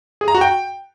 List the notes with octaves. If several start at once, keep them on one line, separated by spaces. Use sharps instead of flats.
G#4
A#5
F#4
G5